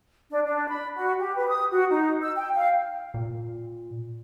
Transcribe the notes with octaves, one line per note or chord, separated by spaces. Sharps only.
D4
D4
B5
F#4
G4
B4
D#6
F#4
D#4
E6
G5
F5
A#2